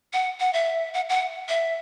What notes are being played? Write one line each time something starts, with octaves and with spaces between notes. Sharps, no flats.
F#5
F#5
E5
F#5
F#5
E5